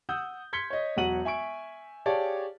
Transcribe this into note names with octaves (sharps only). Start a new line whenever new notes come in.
F#5 D#6 E6 G6
C6 G#6 B6 C#7 G7
C#5 D#5
E1 F#3 F#4 F#5 D#7 F#7
E5 G#5 C#6 D7
G4 G#4 C#5 D5 F5 A5